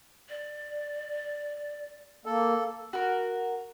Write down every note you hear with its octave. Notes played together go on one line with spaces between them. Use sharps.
D5
A#3 A4
F#4 A#4